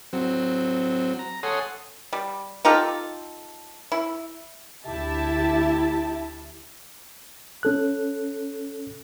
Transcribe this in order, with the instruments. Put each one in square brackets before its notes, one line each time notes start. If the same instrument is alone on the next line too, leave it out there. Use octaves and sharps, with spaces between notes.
[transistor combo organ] F#3 C4
A#5
A4 C#5 F#5 G#5 C6 D#6
[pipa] G3
D#4 F4 G4 A4
E4
[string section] D2 E4 G4 E5 A5
[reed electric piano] C#4 A4 F#6